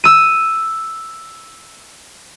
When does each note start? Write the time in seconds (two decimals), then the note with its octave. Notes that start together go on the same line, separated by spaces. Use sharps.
0.04 E6 D#7